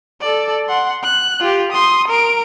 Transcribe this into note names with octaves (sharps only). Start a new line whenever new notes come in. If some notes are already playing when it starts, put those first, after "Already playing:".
A4 D5
F#5 C6
F#6
F4 G4
C6 D#6
A#4 D7